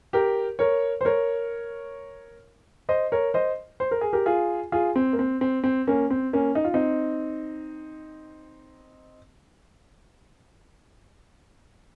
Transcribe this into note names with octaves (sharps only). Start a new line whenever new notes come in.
G4 A#4
A#4 C#5
C5
A#4 C#5
C5 D#5
A#4 C#5
C5 D#5
C5
A#4
G#4
G4 A#4
F4 G#4
F4 G#4
C4
A#3
C4
C4
C4
A#3 C#4
C4
A#3 C#4
D#4
F4
C4 D#4